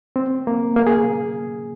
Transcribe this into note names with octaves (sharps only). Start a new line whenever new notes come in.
C4
A#3
A#3
G#4